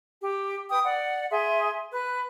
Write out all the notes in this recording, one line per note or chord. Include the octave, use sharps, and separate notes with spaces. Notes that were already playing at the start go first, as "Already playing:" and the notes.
G4
B4 G5 D#6
D5 F#5
G#4 E5 C6
B4 F#6